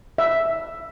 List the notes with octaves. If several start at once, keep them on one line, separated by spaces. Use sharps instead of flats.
E5